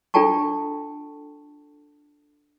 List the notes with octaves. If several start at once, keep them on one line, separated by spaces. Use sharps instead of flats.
D4 F4 A4 G5 A5 C#6